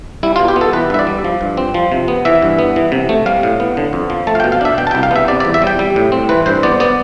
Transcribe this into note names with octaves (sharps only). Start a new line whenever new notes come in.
G3 E4
B2 F4
G4
B3
A4
E3 B4
G2 E5
D5
G3
F3
G2
C4
F3
C3
B3
E3 E5
G2
B3
E3
C3
A3
G3 F5
A2
B3
D3
F2
F3
A3 A5
F5
G5
B2
F5
D4 E5
B2 G5
A5
C2 G5
F5
B3 E5
C3 D5
D5
E2
E5
G3
G5
G3
A2
C4
E3 B4
G2 C5
B3 D5
B3 D5